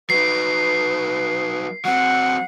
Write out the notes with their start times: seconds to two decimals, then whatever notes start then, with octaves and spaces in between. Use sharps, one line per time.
0.10 F#3 D#4 B4 C7
1.85 F#3 C4 F#5